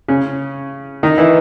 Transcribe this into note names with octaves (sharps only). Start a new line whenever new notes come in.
C#3 C#4
D#3 D#4
E3 E4